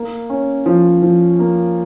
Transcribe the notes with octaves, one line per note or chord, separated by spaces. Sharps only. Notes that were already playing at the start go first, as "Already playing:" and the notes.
Already playing: A#3
C#4
F3
F3
A#3